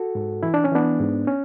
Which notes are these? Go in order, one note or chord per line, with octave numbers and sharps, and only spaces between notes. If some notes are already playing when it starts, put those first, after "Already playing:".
Already playing: F#4 A4
G#2
E3 E4
D4
C#4
E3 B3 D4
G#2
C#4